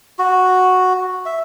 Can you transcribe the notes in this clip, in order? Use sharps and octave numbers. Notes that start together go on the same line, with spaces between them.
F#4
E5